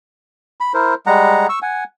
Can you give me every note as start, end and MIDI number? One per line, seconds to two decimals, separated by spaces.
0.61 0.73 83
0.74 0.94 64
0.74 0.94 70
0.74 0.94 72
1.06 1.47 55
1.06 1.47 56
1.06 1.47 78
1.06 1.47 82
1.49 1.59 85
1.49 1.59 88
1.62 1.84 78
1.62 1.84 80